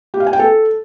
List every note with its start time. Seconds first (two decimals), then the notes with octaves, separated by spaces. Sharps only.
0.14 G4
0.20 F5
0.27 G#5
0.33 G5
0.39 A4